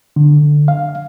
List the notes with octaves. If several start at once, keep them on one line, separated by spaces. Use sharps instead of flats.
D3
F5